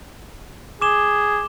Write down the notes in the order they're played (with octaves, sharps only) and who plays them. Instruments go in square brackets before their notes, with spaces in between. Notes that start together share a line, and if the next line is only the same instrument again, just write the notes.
[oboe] G#4 [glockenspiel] D6 E7 G7